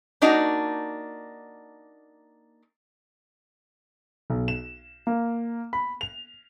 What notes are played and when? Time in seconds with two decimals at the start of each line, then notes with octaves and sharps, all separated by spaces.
0.22 A#3 D4 D#4 F#4
4.30 B1
4.48 E7
5.07 A#3
5.73 B5
6.01 F7